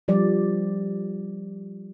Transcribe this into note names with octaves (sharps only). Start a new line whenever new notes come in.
F3 G3 D5